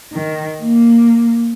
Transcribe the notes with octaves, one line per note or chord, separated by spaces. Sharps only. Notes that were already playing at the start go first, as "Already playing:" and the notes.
D#3
A#3